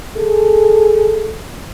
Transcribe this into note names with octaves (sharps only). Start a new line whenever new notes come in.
G#4 A4